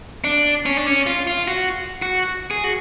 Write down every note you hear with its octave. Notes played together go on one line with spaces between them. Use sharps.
D4
C#4
D4
C#4
F4
F4
F#4
F#4
G#4
F#4